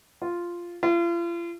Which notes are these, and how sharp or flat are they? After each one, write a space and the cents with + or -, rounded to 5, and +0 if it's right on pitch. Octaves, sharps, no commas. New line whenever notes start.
F4 -5
F4 -40